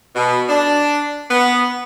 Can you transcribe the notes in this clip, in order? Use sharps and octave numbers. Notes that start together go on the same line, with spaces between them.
B2
D4
B3